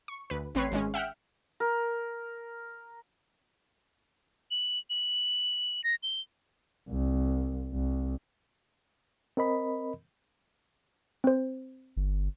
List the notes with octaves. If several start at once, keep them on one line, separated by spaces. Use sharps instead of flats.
C#6
D2 B4
A1 C4 B4 C#5 C7
G#1 G#3 C#4
E5 F#5 G5 F6
A#4
F#7
F#7
A#6
G7
C2
C2
C4 A#4 D#5 B5
C4 C5
G1